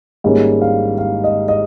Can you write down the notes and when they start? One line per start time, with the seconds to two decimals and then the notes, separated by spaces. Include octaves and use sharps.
0.24 G#1 G#2 G3 A#3 C#4
0.61 F5
0.98 F5
1.24 D#5
1.48 D#5